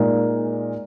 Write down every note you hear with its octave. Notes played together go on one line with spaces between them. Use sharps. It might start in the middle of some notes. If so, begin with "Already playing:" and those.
Already playing: A#2 G#3 D#4 A#4